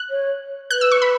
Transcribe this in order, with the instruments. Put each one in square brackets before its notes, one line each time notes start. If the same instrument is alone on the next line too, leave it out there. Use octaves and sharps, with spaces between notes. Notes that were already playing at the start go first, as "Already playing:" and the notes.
Already playing: [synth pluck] F#6
[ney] C#5
[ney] B4 [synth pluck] F#6
[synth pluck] E6
C#6
B5